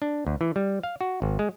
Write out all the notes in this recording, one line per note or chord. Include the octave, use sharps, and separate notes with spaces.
D4
D2
E3
G3
F5
F#4
G#1
G#3